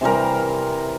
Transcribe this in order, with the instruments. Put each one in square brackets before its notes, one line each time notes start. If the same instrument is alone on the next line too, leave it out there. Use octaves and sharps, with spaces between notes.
[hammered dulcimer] C3 E3 G3 A#4